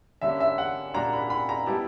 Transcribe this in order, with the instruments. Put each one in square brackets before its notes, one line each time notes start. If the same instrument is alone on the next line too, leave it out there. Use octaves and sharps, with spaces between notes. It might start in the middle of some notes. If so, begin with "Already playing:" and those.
[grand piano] D3 G3 A#3 C#4 [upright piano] E5
[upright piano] E5
F#5
[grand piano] A#2 G3 A#3 D4 F#4 [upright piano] A#5
[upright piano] B5
B5
A#5
[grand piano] G3 B3 E4 G4 [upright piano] A5